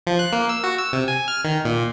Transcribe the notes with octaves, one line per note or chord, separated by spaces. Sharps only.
F3
F#6
A#3
E6
F#4
E6
C3
G#5
F6
D#3
A#2